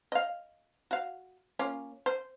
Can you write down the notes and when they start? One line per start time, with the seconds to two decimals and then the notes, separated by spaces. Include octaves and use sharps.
0.12 D#5 F5
0.91 F#4 F5
1.59 A#3 C#4 F4
2.06 C5